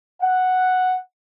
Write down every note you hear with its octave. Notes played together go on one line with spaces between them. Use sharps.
F#5